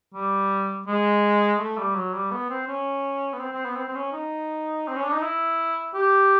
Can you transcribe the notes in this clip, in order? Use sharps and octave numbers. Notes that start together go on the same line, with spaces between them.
G3
G#3
A3
G3
F#3
G3
B3
C4
C#4
B3
C4
C4
B3
C4
C4
C#4
D#4
C4
C#4
D4
D#4
E4
G4